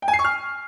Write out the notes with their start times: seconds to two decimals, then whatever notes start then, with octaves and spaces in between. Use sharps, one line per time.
0.02 G5
0.08 G#5
0.13 C7
0.19 C#6
0.24 F6